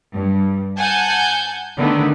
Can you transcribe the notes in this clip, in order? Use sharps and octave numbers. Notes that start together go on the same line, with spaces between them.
G2
F#5 G#5 A5 G6
D3 D#3 A3 B3